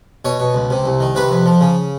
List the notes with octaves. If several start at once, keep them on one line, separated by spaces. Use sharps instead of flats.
B2 C#5
B2
C#2
C3
C2
D#3
C3 B4
F2
F3
C#3